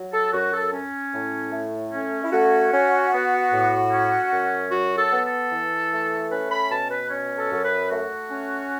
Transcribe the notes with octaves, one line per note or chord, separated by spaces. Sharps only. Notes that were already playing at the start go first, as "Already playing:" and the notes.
Already playing: F#3
A4
F#2 F#4
A4
C#4
A2
A3
C#4
E4
A3 F#4
C#4
B3
A2
C#4
F#2
F#3 F#4
A4
B3
A4
E3
A3
C#4 B4
B5
B2 A5
B4
C#4
A4
F#2
B4
A3 F#4
C#4